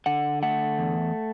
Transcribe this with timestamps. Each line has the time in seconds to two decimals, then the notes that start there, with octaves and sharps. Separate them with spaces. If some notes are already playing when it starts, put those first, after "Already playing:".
0.06 D3 F#5
0.43 A3 F#5
0.79 E2